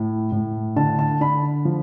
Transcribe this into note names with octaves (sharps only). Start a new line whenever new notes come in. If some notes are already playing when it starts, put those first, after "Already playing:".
Already playing: A2
A2
D3 A5
A5
D3 B5
F3